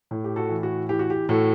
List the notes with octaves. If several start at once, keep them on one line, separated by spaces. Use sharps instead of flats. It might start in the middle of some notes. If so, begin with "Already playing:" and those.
A2
G4
F#4 A4
E3
F#4
E3 G4
F#4
G4
A2 F#4 A4